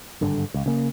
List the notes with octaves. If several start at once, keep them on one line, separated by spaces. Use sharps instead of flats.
G#1 G2 D3
C#2
C#3 A#3